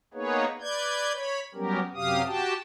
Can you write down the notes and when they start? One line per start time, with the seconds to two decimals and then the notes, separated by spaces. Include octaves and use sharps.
0.14 A#3 B3 D#4 G#4 B4 C#5
0.61 B4 D5 G6 G#6
1.14 C#5 B5
1.55 F#3 G3 B3 C#4 G4 A#4
1.95 F#2 C3 F#3 G4 F5 D#6
2.26 F#4 G4 G5 A5